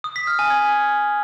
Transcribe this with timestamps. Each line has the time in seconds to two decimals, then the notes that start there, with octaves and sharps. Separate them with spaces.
0.04 D#6
0.16 B6
0.27 F6
0.39 G#5
0.50 G#6